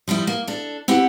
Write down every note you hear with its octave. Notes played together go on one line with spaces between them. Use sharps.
F3 G3 D#4 E4
A#3
D4 A4
C4 E4 G4 F#5